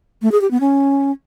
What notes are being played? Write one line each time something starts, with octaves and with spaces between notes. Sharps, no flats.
A3
G#4
G4
B3
C#4